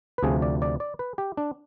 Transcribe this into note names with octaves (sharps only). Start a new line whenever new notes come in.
B4
D2 C3 F3 G#4
D5
D5
D5
B4
G4
D4